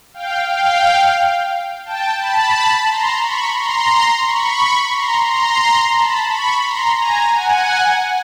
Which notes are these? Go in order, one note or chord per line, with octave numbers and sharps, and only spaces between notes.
F5 G5
F5 G5
G5 A5
A5 B5
A#5 C6
B5 C#6
A#5 C6
B5 C#6
A#5 C6
A#5 C6
A5 B5
B5 C#6
A#5 C6
G#5 A#5
F#5 G#5